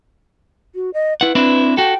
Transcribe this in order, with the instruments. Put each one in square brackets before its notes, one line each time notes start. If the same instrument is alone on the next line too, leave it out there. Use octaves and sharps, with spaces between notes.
[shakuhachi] F#4
D#5
[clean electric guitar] E4 F#5 [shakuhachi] B4
[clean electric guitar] C4 D4 E4
[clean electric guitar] F#4 A4 [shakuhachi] G5